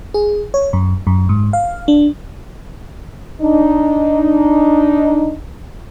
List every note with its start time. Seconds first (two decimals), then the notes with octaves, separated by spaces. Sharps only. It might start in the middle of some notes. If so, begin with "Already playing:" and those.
0.14 G#4
0.54 C#5
0.73 F#2
1.07 F#2
1.29 G#2
1.53 F5
1.88 D4
3.41 D4 D#4